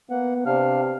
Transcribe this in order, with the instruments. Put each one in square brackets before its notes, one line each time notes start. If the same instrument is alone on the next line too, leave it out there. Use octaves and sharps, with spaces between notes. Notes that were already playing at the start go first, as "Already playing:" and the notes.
[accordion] A#3 F#5 [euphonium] B3
[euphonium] C3 [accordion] D4 F5 F6